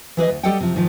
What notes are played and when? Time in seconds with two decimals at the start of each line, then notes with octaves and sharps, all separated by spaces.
0.17 E3 G#4 B4 D#5
0.30 D2
0.43 G3 G4 A4 D#5 F#5 G5
0.60 C3 F3
0.74 G#2 D#3 F3